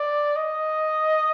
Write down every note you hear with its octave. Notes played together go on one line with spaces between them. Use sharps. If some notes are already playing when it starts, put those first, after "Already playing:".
Already playing: D5
D#5